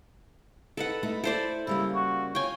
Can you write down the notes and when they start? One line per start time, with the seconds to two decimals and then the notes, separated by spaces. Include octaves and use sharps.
0.77 D#4 A4 B4 F#5
1.03 A3 D#4 E4
1.24 E4 A4 C5 D5
1.67 C#3 G3 A#3 E4
1.95 F#4
2.35 F4 C#5 G5 G#5